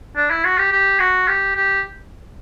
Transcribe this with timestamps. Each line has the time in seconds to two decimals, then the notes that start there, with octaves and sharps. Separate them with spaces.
0.16 D4
0.30 E4
0.45 F#4
0.58 G4
0.72 G4
1.00 F#4
1.28 G4
1.56 G4